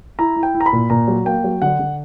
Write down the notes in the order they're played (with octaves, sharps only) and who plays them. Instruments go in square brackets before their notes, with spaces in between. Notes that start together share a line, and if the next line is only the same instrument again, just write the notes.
[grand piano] E4 A#5
E4
G5
E4
A#5
B5
A#2
A#2 A#5
F#3
A#3 G5
F#3
D3 F#5
D3